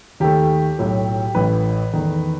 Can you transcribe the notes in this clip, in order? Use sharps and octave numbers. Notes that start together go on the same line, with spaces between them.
D#2 D#3 A3 G4
B1 A2 F#3 A3
A1 A2 E3 B4
E2 D#3 A3